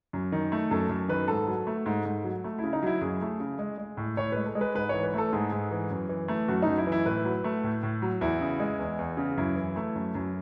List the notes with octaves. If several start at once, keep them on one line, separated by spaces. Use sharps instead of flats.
F#2
D#3
A3
F#2 A4
F#2
D#3 B4
G#2 A4
F#3
A3
G#2
G#2
F#3
A3
E4
C#3
D#4
F#3 E4
F#2 G#4
A3
C#3
G#3
G#3
A2
A2 C#5
G#3 B4
A4
G#3
B4
G#2 B4
E3 C#5
B4
A3 A4
G#2 G#4
G#2
E3
F#2
E3
A3
F#2 F#4
F#2 D#4
E4
E3
E4
A2 B4
F#3
A3
A2
A2
F#3
E2 E4
C#3
G#3
E2
E2
C#3
F#2 E4
E3
A3
F#2
F#2